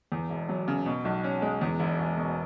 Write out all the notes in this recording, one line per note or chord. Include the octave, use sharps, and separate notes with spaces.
E2
E1
F#3
C#3
B2
B1
C#4
G#3
E2
E1
E1
B2